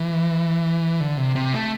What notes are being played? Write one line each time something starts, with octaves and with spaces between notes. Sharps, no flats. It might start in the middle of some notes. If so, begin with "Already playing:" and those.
Already playing: E3
D3
C3
C3
A3